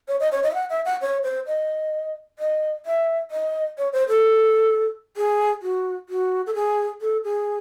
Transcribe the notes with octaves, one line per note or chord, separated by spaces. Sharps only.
C#5
D#5
C#5
D#5
E5
F#5
E5
F#5
C#5
C5
D#5
D#5
E5
D#5
C#5
C5
A4
G#4
F#4
F#4
A4
G#4
A4
G#4